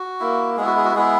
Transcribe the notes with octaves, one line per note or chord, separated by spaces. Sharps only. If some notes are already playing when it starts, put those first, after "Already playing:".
Already playing: F#4
A#3 E4
G#3 B3 E4 G#4
F#4
G#4
F#4
G#3 B3 E4 G#4